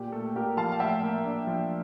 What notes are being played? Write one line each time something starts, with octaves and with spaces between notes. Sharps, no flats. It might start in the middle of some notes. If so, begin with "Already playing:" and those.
Already playing: A#2 G4
A3 A4
A#2 G4 A#4
F3 F5 A5
F5
A2 E5 G5
A#3
D4
F3